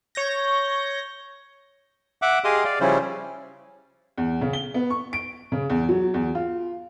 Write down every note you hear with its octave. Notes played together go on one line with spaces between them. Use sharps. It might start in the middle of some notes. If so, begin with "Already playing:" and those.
C#5 G6 A#6
E5 F#5 D6
G4 G#4 D#5 F5 C6 D#6
D5 F5
C#3 F3 G3 C#4 E4 C5
E2
C#3
G7
B3
C#6
D7
C#3
E2
F#3
E2
F4